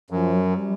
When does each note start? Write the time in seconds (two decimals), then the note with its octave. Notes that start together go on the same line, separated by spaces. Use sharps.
0.11 F#2 F3
0.34 F#3
0.57 G3